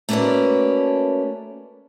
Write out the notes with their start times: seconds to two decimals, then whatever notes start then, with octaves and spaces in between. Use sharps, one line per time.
0.09 A3 A#3 C#4 F#4 B4 D5